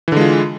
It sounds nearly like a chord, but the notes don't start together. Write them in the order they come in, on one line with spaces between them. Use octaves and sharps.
E3 D3 G#3 F4